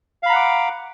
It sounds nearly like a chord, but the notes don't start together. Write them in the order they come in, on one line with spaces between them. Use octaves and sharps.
F5 B5 A#5 F#5 D6